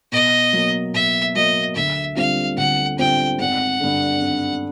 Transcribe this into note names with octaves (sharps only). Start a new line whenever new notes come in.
B2 D#5
F#3 A#3
B2 E5
F#3 A#3 D#5
D2 E5
D3 G3 C4 F4 F5
D2 F#5
D3 G3 C4 F4 G5
G#1 F#5
G2 D3
G#1